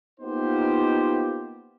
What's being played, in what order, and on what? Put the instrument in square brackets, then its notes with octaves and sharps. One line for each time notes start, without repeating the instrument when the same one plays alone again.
[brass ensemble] A#3 B3 D#4 F4 G4 C5